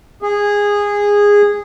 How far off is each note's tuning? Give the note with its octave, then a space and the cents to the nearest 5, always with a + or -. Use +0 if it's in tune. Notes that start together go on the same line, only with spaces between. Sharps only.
G#4 -15